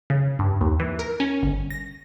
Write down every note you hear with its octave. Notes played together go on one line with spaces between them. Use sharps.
C#3
G2
D#2
E3
A#4
C#4
G1
A#6